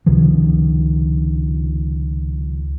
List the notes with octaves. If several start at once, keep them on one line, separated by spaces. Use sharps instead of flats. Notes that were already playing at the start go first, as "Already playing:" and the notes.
C#2 C3 D#3 F3